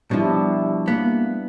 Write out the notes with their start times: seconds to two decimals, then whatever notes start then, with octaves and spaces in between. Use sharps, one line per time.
0.11 B2 F3 G3 D4 E4
0.88 A#3 B3